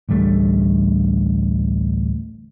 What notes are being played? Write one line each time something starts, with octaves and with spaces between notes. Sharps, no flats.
A1 D2 G3 A3